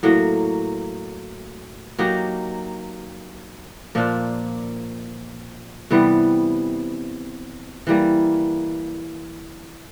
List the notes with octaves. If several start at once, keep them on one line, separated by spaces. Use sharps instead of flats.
A2 F#3 A#3
F#3 A#3 D#4 G4
A#2 F3 A#3 D4
C3 E3 G3 B3
E3 G3 A#3